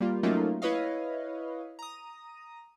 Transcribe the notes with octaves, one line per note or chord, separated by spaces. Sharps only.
G3 A#3 F4
F#3 A3 A#3 C#4 D#4 F4
E4 B4 C#5 D#5 F5
A#5 D#6